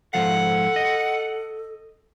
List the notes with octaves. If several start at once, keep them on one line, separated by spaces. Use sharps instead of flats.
G#2 F3 A4 F5 F#5
D#5